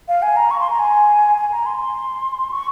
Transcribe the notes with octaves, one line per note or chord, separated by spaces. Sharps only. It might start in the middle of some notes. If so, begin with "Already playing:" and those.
F5
G#5
A#5
C#6
C6
A#5
G#5
G#5
A#5
C6
C#6